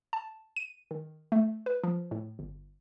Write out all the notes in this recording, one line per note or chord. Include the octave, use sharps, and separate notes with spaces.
A5
D#7
D#3
A3
B4
F3
A2
G1